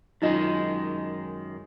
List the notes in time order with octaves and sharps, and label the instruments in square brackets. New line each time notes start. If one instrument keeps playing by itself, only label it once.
[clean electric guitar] F#2 D#3 G#3 [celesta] D#4 F4 D#5